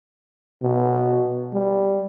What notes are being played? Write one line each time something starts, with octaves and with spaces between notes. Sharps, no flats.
B2
G3